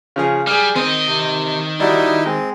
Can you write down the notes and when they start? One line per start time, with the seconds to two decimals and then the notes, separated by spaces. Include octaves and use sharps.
0.16 C#3 F3 G#4
0.47 G3 G#4 F6
0.76 D#3 C4 D#5
1.07 C3
1.80 G3 D#4 E4 F#4
2.25 G#3 C4